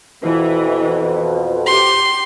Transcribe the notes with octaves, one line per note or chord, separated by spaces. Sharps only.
F2 B2 E3
G4 C6